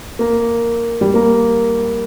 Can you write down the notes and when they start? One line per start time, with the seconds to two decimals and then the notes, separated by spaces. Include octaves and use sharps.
0.19 A#3
1.01 G3
1.14 A#3